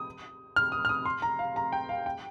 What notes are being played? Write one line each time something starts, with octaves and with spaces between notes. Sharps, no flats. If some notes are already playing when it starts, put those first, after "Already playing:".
Already playing: D#6
F6
D#6
F6
D#6
C6
A#5
F5
A#5
G5
F5
G5